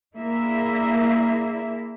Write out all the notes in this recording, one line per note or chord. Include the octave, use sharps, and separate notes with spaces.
A#3 D4 E4 G#4 E5